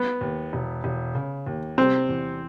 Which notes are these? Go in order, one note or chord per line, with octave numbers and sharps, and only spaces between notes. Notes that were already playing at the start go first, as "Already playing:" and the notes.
Already playing: B3
D#2
E1
E1
C#3
D#2
C3 C4
E2